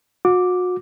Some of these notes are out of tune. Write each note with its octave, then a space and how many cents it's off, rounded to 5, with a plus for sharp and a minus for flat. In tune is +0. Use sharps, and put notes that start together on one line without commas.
F#4 -35 D6 +0